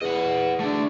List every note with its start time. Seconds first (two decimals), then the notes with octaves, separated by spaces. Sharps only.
0.01 E2 D#5 F#5
0.60 A3 D4